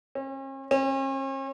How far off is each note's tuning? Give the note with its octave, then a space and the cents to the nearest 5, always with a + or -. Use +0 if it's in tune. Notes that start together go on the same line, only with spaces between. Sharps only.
C#4 -45
C#4 -45